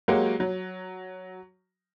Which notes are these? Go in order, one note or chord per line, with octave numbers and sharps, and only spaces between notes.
F#3 G#3 A#3 F#4 G4
F#3